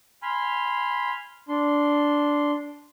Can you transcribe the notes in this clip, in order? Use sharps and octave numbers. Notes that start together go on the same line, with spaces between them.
G#5 B5 C6 F6
D4 C6